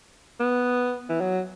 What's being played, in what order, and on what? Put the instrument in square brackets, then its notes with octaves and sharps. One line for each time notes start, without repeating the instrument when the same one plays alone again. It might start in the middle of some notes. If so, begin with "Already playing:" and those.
[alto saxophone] B3
E3
F#3